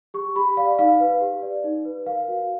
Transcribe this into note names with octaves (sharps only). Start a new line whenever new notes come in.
G4 C#6
G4 B5
D5 F5
D#4 F5
B4
G4
D5
D#4
B4
A#4 F5
F#4